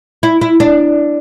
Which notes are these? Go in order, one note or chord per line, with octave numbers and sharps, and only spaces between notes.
E4
E4
D4